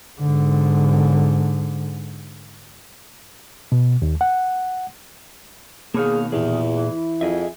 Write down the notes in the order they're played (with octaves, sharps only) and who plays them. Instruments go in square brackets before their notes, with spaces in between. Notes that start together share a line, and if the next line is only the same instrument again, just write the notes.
[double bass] G#2 D3
[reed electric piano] B2
D#2
F#5
[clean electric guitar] B2 D#3 [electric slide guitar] A#3 C#5 F5 [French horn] G#4
[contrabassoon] E2 [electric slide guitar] A#2 G4 G#4 [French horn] E3
[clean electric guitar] E3 [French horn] E4
[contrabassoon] F2 [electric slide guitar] G#4 D#5 E5